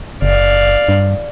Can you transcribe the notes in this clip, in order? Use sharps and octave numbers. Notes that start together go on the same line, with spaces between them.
F#1 D5 F5
G2